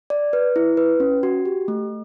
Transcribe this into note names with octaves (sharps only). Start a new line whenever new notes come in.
D5
B4
E4
B4
C#4
F#4
G4
A3